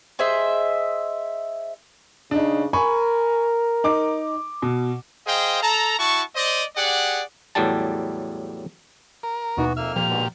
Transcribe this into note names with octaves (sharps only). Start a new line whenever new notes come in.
G#4 C5 D#5 E5
C#3 D4 D#4
A#4 G#5 B5 C#6
D#4 D6
B2
G#4 C5 D#5 F5 G5
A4 A5 A#5
E4 F#4 A5 C#6
C5 D5 D#5
G4 G#4 D5 F#5
E2 A2 F#3 G3 A5
A#4
D#2 B2 E3 B3 D#4 F#4
F2 A#3 E5 F6
A#2 F3 G4 F7
G#2 B2 D3